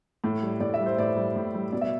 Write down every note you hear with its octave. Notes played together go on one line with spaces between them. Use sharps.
A2
G3
A2 D5
E5
G3
C5
A2 D5
G3
A2
G3
B2 D5
E5